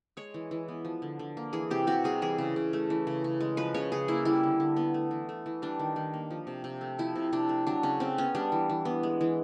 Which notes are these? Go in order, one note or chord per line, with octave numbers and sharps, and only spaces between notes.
G#3 C#5
E3
E3
B3
F3
D3
D3
A#3
E3 G#4
C3 G4
C3 F#4
G3 G#4
E3 G#4
C#3
C#3
A3
E3
C#3
C#3
G#3
F3 B4
C#3 C#5
C#3 G#4
A#3 E4
G3 E4
D3
D3
B3
A3
E3
A3
E3
G3 D4
D#3
D#3
A#3
F3
C3
C3
A3
F3 E4
C3
C3 D4
A3
F#3 D4
C#3 C#4
C#3 C4
B3 C#4
G3 D4
E3
E3
B3
G#3
E3